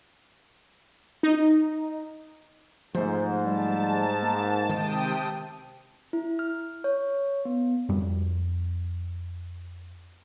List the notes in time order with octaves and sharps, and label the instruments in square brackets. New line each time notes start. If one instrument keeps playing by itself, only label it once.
[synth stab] D#4
[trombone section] G#2 [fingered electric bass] F3 A3 [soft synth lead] C5
[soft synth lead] G3 [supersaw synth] A5
[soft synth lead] A#3
[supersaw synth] C3 G5 D#6 [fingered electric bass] D#3 G#3 [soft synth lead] A5
[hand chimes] E4
F6
C#5
B3
[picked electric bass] F2 G3